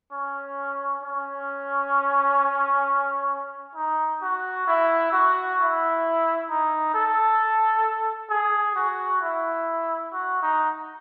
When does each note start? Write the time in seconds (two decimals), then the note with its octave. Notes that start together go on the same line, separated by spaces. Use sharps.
0.12 C#4
1.03 C#4
3.76 D#4
4.22 F#4
4.67 E4
5.12 F#4
5.59 E4
6.49 D#4
6.94 A4
8.30 G#4
8.76 F#4
9.22 E4
10.13 F#4
10.42 D#4